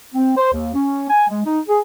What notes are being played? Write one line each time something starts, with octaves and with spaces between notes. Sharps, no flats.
C4
C5
D#2
C#4
G#5
G#3
D#4
G#4